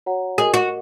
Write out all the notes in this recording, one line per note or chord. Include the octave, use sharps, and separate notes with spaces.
F#4 C#5 F#5 A#5
F#4 G#4 A#4 D#5
F#4